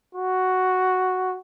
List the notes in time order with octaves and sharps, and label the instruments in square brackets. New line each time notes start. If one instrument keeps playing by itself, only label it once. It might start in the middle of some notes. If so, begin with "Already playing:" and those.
[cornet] F#4